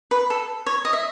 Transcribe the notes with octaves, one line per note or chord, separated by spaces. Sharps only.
B4
A4
C#5
D#5
E5